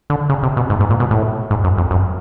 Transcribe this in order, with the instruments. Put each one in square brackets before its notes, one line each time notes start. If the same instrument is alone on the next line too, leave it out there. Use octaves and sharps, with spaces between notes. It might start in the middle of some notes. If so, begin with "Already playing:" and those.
[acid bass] D3
C#3
C3
B2
G#2
G#2
A#2
B2
A2
G#2
F#2
F2
F#2